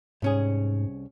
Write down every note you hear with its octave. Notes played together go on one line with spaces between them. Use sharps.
C2 G#2 C#4 G#4